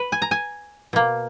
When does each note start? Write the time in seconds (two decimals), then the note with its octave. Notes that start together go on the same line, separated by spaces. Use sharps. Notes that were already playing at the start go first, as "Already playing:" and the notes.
Already playing: B4
0.12 G#5
0.22 A#5
0.31 G#5
0.93 B2 A#3